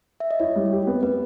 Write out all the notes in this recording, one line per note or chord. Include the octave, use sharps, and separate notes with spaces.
E5
D#5
E4 C#5
G3
G4
B3
B3 B4